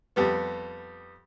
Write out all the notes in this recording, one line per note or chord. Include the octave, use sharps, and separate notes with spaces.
F2 G3 B3